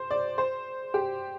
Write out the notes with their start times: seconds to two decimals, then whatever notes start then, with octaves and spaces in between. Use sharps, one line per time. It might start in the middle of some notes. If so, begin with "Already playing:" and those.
Already playing: C5
0.11 D5
0.38 C5
0.94 G4